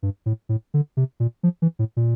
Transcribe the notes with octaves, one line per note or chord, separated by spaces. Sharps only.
G2
A2
A2
D3
C3
A#2
F3
E3
A2
A#2